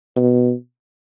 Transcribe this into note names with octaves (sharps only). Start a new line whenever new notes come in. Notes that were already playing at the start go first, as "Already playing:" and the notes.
B2